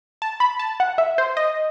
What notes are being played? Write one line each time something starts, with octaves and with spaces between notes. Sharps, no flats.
A5
B5
A5
F#5
E5
C5
D#5